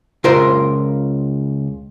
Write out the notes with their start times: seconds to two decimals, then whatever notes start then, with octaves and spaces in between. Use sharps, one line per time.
0.24 C#2 F4 A#4 C5